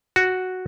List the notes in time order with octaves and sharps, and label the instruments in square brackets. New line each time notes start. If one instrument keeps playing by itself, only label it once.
[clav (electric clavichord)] F#4